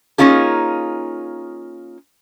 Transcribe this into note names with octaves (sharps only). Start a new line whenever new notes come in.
A#3 C#4 D#4 F4 G#4